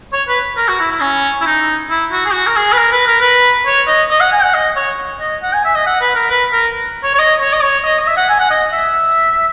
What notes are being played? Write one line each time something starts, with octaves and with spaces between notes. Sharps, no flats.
C#5
B4
A#4
F#4
E4
E4
C#4
E4
D#4
E4
F#4
G#4
F#4
A#4
G#4
B4
A#4
B4
A#4
B4
C#5
D#5
D#5
F#5
G#5
F#5
D#5
C#5
D#5
F#5
G#5
E5
D#5
F#5
B4
A#4
B4
A#4
C#5
C#5
D#5
C#5
D#5
C#5
D#5
D#5
E5
F#5
G#5
F#5
D#5
E5